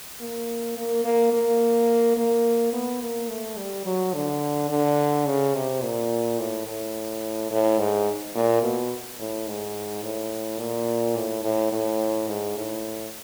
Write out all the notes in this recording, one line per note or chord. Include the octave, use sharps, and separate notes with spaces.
A#3
A#3
A#3
A#3
A#3
B3
A#3
A3
G3
F#3
D3
D3
C#3
C3
A#2
A2
A2
A2
G#2
A#2
B2
A2
G#2
A2
A#2
A2
A2
A2
G#2
A2